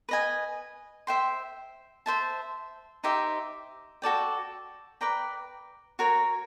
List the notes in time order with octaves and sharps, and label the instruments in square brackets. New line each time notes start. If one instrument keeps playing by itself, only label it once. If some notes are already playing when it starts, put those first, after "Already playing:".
[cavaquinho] B4 D#5 G#5
C5 E5 G5 C6
C5 E5 A5
D#4 G4 C5 E5
F#4 A4 D5 G5
B4 D5 G5 A#5
F#4 A#4 C#5